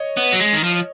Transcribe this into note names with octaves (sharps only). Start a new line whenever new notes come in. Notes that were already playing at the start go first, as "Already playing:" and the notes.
Already playing: C#5 D#5
B3
F#3
G#3
D#3
F3